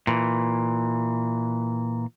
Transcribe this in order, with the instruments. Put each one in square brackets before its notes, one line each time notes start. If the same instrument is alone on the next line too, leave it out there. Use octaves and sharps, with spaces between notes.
[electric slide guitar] A#2 E3